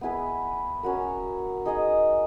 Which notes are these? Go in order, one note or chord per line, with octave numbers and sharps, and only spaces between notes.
B3 E4 G#4 B4
C#4 F#4 A#4
D#4 G#4 D#5